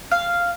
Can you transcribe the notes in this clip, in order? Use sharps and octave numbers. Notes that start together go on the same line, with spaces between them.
F5